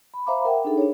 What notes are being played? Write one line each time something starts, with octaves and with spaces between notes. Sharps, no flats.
B5
C5 E5 F5 A#5 B5 D6
A#4 E5 F#5 G5
D4 D#4 G#4 A4
D4 G#4 C#5